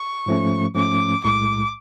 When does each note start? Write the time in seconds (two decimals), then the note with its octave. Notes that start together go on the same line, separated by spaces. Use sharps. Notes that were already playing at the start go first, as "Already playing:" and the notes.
Already playing: C#6
0.26 G#2 F3 A3 C#4
0.75 G#2 F3 A3 C#4 D6
1.24 B1 A2 G#3 D6